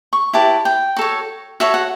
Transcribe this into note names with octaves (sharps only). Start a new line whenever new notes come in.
C#6
E4 G4 B4 A5
G5
F#4 A4 C#5
F#4 A4 C#5 E5
F#5